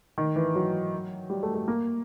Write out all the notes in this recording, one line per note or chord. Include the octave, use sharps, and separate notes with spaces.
D#3
E3
F#3
G3
A3
A3
A#3